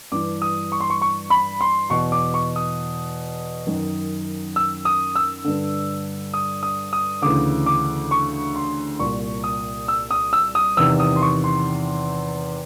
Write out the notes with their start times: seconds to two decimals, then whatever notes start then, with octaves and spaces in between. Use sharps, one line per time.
0.12 G2 E3 D6
0.42 D#6
0.72 C#6
0.80 C6
0.90 C#6
1.01 C#6
1.30 B5
1.61 C6
1.90 E2 B2 C#6
2.12 D6
2.34 C#6
2.56 D#6
3.67 F#2 D#3
4.56 E6
4.85 D#6
5.16 E6
5.44 G2 D3
6.34 D#6
6.63 D#6
6.93 D#6
7.22 D2 C#3 E3 D6
7.66 D6
8.11 C#6
8.56 C6
8.99 C2 A#2 C#6
9.44 D#6
9.88 E6
10.11 D#6
10.33 E6
10.55 D#6
10.77 E2 C3 D#3 E6
11.00 D#6
11.16 C6
11.22 C#6
11.44 C6